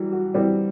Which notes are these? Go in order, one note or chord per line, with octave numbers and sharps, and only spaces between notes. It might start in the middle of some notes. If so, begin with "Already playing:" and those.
Already playing: E3 F#3 G3
F#4
E3 G3 C4